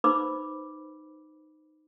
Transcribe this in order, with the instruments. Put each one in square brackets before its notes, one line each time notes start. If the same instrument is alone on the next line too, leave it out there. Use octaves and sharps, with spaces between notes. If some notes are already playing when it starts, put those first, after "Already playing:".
[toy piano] D#4 B4 C5 B5 D6 E6